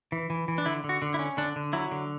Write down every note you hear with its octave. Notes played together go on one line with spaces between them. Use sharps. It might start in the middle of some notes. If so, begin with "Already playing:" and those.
E3
E3
E3
D4
D3 E4
D3
F#4
D3
E4
C#4
D3 D4
D3
F#3 E4
D3